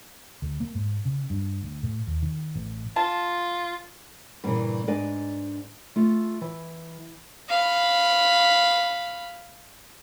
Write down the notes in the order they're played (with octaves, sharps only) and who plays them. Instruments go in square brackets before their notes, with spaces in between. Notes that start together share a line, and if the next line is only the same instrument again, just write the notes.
[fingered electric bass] D2
A#3
G#2
C#3
G2
D2
A2
D#2
D#3
A1
[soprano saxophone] F4 [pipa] A5
[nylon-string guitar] G2 A#2 C#3 E3
G#2 D4 B4 D5 D#5 G#5
A3 F4
E3
[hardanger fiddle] F5 B5